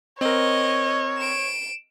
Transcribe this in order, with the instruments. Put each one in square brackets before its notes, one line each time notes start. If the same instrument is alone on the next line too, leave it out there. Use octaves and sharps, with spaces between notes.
[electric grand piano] C4 A#4 [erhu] C#5 [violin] D#5
[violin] D7 E7